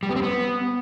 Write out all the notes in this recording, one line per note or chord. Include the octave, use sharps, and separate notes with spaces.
G3
B3
C4
B3